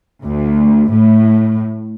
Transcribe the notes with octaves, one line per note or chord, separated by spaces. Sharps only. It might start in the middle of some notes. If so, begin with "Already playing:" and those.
D2
A2